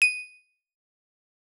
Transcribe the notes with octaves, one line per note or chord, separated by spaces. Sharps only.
D#7